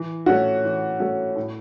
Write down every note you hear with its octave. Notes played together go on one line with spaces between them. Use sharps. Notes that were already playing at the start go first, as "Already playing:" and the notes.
Already playing: E3
A3 C#4 F#4
E3
A3 C#4 F#4
A2